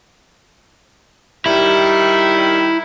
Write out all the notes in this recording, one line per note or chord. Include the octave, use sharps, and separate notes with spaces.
D#3 G3 E4